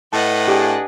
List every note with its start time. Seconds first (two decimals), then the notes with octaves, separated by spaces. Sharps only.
0.13 A2 B4 D#5 F#5 A5
0.48 D4 G4 G#4